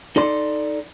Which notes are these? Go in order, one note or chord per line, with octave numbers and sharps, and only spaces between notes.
D#4 A4 D5 C6